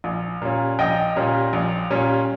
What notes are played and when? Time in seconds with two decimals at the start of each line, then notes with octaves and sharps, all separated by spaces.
0.04 A#1
0.42 A#2 G3 C#4
0.79 A#1 D#5 G5
1.16 A#2 G3 C#4
1.53 A#1
1.90 A#2 G3 C#4